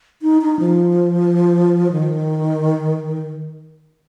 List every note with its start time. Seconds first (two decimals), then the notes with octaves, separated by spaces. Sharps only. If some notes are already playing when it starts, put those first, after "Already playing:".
0.22 D#4
0.42 D#4
0.60 F3
1.92 D#3